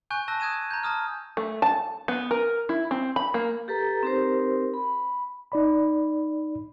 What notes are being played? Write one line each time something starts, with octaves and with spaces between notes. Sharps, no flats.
G#5 C#6 F#6 G6
A5 E6 F#6 G6 A#6
D#6 F#6 G#6 D#7 E7
A#5 G6
A5 A#5 D#6 F6
A3
A5
B3
A#4
E4
C4
B5
A#3
G4 A4 B4 A#5
C4 D#4 G4 A#4 C5
B5
D#4 D5 B5